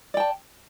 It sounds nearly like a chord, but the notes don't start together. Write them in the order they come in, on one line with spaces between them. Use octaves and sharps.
D5 G5 A5